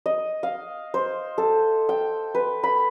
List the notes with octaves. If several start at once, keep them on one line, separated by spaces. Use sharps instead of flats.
D#5
F5
C5
A4
G5
B4
B5